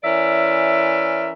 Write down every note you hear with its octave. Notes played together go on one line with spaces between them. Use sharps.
E3 C#4 A#4 D5 E5